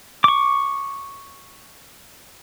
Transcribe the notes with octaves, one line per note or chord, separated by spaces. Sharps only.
C#6 D6